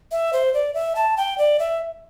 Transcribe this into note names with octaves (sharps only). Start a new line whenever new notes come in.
E5
C5
D5
E5
A5
G5
D5
E5